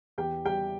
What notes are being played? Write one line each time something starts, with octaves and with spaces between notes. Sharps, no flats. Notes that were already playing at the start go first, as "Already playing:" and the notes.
E2 G4 G5
G3 G4 G5